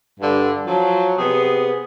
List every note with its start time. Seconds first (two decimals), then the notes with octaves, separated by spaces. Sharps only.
0.20 G2 D3
0.67 F3 F#3
1.18 C3 B3 G#4